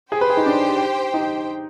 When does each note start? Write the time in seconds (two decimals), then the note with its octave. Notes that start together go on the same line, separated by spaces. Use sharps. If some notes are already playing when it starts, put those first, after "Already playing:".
0.12 G4 G#4 C5 G5
0.21 B4
0.30 G#4
0.37 D#4
0.46 D4
1.14 D#4